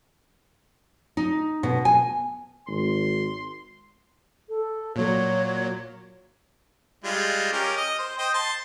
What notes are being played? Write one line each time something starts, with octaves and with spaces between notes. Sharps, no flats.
D#4
B2
G#5
G#1 C6
A4
A#2 F#3 C#5
G3 G#3 F4
C#4 G4 A#4
D#5
C5
C5 D#5 G5
A5 C6